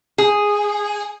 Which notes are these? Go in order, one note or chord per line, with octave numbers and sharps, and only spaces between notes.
G#4